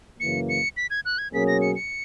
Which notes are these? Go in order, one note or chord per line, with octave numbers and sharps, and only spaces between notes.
F#2 C#3 E3 A#3 C#7
C#7
B6
G#6
F#6
G#6
B2 F#3 A#3 C#4 G#4 B6
A#6
C#7
C#7